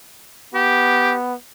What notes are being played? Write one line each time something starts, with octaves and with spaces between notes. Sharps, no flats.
B3 G4